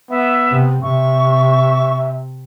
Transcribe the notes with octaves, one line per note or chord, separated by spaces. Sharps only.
B3 E5
C3
C3 E5 C#6